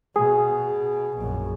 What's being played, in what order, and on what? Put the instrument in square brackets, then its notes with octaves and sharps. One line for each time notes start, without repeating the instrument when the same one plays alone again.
[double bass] B2 [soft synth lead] G#4
[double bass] A#1 F#2